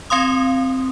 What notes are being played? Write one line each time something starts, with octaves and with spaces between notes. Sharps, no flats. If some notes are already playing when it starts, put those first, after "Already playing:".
C4 F5 C6 D#6